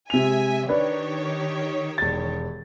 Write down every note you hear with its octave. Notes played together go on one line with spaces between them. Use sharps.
C3 G#3 E5 G#5 F7
D#3 D4 G4 B4 C#5
E1 A6